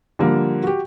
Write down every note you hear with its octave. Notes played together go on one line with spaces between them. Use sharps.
D3 F3 G3 A#3
F#4 G4